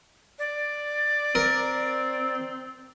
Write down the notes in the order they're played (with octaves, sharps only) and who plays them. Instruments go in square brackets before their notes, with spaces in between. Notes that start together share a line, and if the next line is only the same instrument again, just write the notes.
[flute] D5
[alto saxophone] C4 [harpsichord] A#4